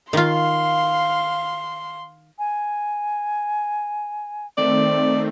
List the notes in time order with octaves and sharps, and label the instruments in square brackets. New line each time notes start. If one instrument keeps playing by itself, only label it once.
[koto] D#3 F4 [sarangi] F5 [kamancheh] C6
[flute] G#5
[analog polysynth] D#3 A3 C4 [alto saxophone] D5